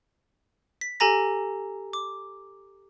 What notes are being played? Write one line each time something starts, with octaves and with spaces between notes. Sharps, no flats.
B6
G4 A4 G#5 A#5 A#6
D6